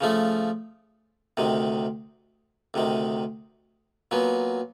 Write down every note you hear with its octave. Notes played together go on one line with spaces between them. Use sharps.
C#3 F3 A3
D2 C3 D#3
D2 C3 D#3
A#2 F#3 B3